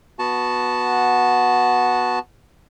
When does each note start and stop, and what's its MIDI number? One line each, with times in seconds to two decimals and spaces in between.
0.19 2.19 59
0.19 2.19 66
0.19 2.19 81